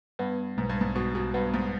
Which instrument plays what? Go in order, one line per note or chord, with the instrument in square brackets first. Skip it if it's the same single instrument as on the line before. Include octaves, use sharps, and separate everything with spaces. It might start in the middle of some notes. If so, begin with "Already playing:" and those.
[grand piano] G2 [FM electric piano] B3
[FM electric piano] B1 [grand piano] G#2
[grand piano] G2
G#2
[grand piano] B2 [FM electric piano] B3
[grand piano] B2
[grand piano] G2 [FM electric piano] B3
[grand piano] G#2